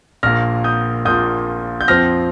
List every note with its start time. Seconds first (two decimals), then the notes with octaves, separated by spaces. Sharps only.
0.23 A#1 A#2 A#3 F6 A#6
0.64 D#6 G6
1.05 A#1 A#2 A#3 D#6 G6
1.81 G6
1.88 F2 F3 C4 F6 A#6